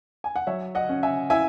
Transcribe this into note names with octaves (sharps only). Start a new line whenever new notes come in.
G#5
F#5
F#3 C#5 E5
D#5 F#5
C#4
E5 G#5
E4 E5 G#5